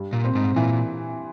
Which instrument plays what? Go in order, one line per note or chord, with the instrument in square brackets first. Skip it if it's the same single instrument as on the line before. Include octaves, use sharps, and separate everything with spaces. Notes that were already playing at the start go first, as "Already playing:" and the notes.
Already playing: [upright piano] G2
[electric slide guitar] A#2
[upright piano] C4
[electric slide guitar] G#2
[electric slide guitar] A#2 [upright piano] E3